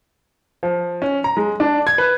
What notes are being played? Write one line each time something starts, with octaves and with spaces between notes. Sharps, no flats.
F3
C#4
A#5
G#3
D4
G#6
B4